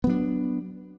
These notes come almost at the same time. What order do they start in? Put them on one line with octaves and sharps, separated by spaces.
B3 F#3 D4